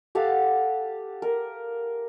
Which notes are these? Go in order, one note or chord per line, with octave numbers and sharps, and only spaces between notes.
G4 A4 F5 F#5
A#4